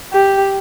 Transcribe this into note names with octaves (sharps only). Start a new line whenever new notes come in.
G4